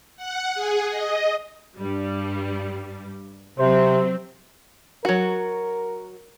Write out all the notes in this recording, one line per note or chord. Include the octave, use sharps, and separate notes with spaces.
F#5
G#4
D#5
G2 G3
C3 F#3 C4 C5
F#3 F#4 A#4